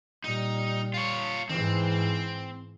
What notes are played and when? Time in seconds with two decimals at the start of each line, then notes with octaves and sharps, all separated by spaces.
0.24 A#2 G3 D#4
0.94 F4 C#5
1.49 G#2 E3 C4